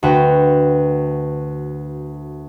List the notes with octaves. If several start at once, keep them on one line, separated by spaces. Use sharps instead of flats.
D2 F#4 B4 G5